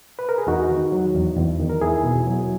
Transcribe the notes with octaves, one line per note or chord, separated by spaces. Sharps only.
B4
A#4
G#4
E2 D#4 F#4
D#3
F#3
E2
E2
D#3
A#4
E2 E4 G#4
B2
F#3